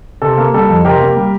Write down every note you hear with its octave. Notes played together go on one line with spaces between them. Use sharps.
C3 A4
A#3
G3 A4
F2
C3 G4 A#4
A#3
G3